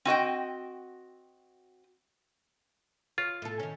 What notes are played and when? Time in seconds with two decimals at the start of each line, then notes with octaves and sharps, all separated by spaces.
0.05 C4 F#4 D#5 G5
3.18 F4 C#5
3.42 A2 A4
3.59 D#3 C#4